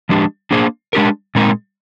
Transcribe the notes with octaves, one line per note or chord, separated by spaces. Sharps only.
F3 G#3 D4 G4
A#3 D4 G#4 C5
G#3 D4 G4 A#4
A#2 G#3 C4 D#4 A#4